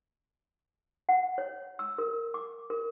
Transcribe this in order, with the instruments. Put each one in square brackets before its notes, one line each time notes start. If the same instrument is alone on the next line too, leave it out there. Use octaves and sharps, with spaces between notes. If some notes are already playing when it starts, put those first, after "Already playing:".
[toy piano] F#5
C#5
E6
A#4
D6
A#4